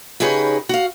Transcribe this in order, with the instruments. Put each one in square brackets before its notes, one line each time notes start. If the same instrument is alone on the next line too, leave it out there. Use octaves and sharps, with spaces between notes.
[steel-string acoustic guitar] C#3 D#4 G4 G#4 B4 C#5
F#4 F5